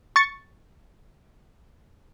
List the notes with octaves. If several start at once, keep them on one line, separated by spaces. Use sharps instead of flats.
C#6 A6 C#7